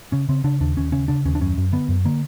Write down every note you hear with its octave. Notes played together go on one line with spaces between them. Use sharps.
C#3 C#4
C#3 C4
C#3 D4
D#2 D4
D#2 C#4
C#3 C#4
C#3 D4
D#2 C#4
D4
F#2 C#4
F#2
D3 B3
F#2
D3 A#3